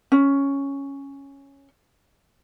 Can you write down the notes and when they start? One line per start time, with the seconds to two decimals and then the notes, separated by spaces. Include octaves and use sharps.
0.12 C#4